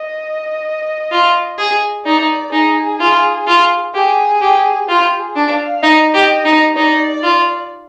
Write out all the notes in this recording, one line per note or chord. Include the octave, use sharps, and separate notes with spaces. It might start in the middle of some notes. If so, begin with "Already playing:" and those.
Already playing: D#5
F4
G#4
D#4 D5
D#4 G#4
F4
F4
G4 G#4
G4
F4 G4
G#4
D4
F5
D#4 D#5
G4
D#4
D#4 D5
F4